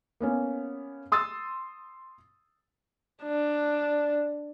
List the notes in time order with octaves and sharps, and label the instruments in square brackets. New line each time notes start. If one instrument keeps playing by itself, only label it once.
[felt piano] A#3 B3 C#4
C6 D#6 E6 A6
[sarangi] D4